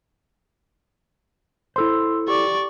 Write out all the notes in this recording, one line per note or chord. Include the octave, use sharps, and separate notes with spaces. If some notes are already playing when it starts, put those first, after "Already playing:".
E4 A4 C5 C6 E6
G4 D5 C#6